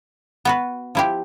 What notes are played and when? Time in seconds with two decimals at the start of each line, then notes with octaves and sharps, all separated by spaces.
0.45 B3 F#4 B4
0.95 F3 E4 G4